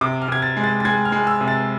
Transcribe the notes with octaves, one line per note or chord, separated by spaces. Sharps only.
C3 D6
F6
C3 G#6
A6
G#3
A6
A6
G#3 G#6
F6
G#3
E6
C3
A6